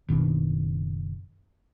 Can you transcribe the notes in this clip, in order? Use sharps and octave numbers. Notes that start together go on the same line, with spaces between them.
F#1 B2 D#3 D4